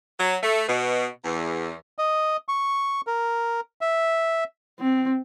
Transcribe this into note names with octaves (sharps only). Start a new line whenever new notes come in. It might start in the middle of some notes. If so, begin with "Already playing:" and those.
F#3
A3
B2
E2
D#5
C#6
A#4
E5
C4